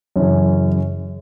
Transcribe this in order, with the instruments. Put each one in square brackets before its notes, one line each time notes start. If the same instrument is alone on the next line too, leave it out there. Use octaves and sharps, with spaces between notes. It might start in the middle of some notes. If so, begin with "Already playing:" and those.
[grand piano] F#2 C#3 E3 C#4